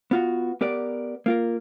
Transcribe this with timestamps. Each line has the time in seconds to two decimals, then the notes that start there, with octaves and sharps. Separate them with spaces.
0.11 B3 F4 F#4
0.61 B3 G4 A#4 D5
1.26 A#3 F4 A#4